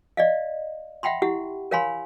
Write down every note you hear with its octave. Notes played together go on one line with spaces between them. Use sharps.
D5 D#5 F5
E5 F#5 G5 B5 C6
E4 G4 F#5
A#4 C#5 F5 G#5 B5 C6